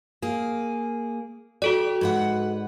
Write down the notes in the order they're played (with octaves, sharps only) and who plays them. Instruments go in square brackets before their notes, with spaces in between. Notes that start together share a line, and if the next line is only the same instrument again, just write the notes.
[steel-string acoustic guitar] A#3 G#4
[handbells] F#4 A4 D5 [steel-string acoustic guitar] G4
[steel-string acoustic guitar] G#2 B4 F#5